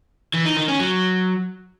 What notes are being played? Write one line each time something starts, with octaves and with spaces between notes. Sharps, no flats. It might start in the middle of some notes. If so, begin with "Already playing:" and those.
E3
D#4
D#3
C#4
F#3